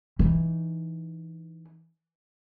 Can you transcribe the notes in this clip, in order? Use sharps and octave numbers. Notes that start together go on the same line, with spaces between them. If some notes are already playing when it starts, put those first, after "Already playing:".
E3 D#4